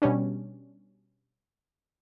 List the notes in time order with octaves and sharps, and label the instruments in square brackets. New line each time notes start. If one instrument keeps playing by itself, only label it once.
[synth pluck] B2 G3 C#4 D4